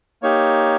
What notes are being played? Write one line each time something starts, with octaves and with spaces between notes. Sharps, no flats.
A#3 D#4 G4 C#5